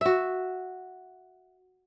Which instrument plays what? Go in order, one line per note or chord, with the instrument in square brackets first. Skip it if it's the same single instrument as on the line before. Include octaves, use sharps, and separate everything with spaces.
[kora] F#4 E5